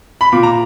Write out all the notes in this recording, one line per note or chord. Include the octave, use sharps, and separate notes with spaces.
B5
A#2 D6
A#5